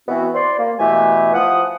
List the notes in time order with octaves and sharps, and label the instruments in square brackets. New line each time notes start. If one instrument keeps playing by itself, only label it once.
[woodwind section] E3 B3 C4 F#4
C5 D5 C6
A#3
B2 E3 A3 G4 E5 G#5
F3 F#5 D#6